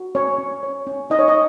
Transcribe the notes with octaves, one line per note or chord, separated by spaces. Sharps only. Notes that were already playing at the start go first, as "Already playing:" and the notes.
Already playing: F#4
C#4 C#5
C#4
C#5
C#4
D#4 D#5
C#5
D#5